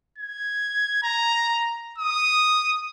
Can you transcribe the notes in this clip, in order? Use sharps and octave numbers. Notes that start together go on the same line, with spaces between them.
G#6
A#5
D#6